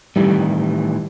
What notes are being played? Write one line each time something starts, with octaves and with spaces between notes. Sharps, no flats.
A2 D#3 E3 G3